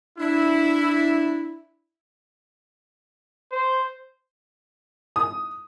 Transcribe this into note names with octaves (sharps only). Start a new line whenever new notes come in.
D4 E4
C5
D#6